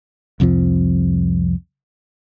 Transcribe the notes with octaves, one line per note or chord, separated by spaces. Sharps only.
C2 F2 C3 F3